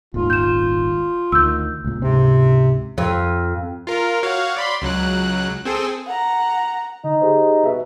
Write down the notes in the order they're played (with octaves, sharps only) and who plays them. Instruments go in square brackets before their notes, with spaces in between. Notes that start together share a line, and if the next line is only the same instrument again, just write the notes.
[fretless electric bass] D#1 G#1 D#2 [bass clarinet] F4
[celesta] G6 E7
[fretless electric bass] D2 D#3 [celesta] E6 G6
[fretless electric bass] C#2 A#2
[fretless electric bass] C#2 G#2 C4 [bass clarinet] C3
[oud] F2
[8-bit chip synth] F4 A#4
F#4 C#5 F5
D5 B5 C6
C#2 F#3 F#6
C4 G#4 A4
[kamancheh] F#5 A#5
[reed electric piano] D3 [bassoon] D#4
[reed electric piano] G4 G#4 C5
[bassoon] B2 [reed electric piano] E5